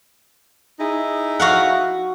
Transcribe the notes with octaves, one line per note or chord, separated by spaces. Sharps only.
D#4 E4 G#4
F#4 F5 F#5